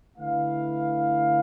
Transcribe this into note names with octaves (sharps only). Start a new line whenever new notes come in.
D3 A3 E4 B4 F5